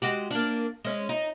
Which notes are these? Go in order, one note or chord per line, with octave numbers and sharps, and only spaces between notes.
G#3 F#4 G4
A#3 D4
G#3 C#4
D#4